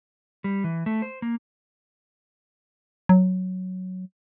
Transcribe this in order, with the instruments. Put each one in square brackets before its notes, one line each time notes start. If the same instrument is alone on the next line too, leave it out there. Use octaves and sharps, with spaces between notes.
[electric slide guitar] G3
E3
A3
C5
A#3
[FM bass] F#3